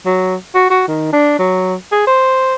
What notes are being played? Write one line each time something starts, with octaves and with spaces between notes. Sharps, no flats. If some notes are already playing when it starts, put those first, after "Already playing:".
F#3
F#4
F#4
D#3
D4
F#3
G#4
C5